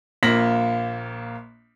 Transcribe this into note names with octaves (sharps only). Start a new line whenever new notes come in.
A#1 A#3 F4 A#6 B6 F#7